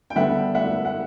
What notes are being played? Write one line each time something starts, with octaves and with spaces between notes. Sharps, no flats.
G5
D3 G3 B3 D4 E5 F#5
E5 F#5
F#5